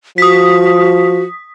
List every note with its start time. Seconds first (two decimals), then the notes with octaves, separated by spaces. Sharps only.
0.18 F3 F#4 D#6 B6